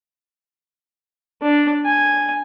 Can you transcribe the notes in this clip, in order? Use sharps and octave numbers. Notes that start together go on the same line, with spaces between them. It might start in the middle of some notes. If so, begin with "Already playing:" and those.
D4
G#5